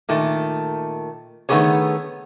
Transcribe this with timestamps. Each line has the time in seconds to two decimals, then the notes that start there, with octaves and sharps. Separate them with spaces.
0.09 A#2 D#3 A3
1.49 D#3 A3 B3 G4 G#4 C#5